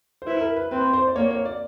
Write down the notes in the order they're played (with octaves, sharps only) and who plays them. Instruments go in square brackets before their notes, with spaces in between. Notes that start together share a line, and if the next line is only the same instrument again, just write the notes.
[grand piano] C5
[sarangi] E4 [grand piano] B4
[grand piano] A#4
B4
[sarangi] C4 [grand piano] B4
[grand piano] C5
D5
[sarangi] A#3 [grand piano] C#5
[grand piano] C#5
D5